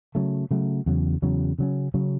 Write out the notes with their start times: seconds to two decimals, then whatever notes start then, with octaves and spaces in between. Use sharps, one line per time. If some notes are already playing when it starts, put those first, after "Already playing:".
0.15 C#3 F#3 A3
0.51 C#3 F#3 A3
0.86 E2 C#3 F#3
1.22 E2 C#3 F#3
1.59 C#3 F#3 C#4
1.94 C#3 F#3 C#4